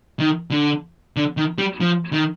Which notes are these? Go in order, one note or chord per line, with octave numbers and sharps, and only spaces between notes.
D#3
D3
D3
D#3
G3
F3
D#3